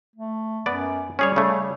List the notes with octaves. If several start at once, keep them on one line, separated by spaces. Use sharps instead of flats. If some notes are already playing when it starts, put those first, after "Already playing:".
A3
F#2 B3 D5
G3 C#4 G#4 C#5
C#3 A3